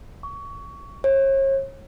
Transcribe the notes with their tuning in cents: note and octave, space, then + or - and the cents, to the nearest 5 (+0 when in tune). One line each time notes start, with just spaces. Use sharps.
C#6 +25
C#5 -40